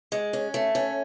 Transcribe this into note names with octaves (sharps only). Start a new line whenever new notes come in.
G#3
C#4
A3
C#4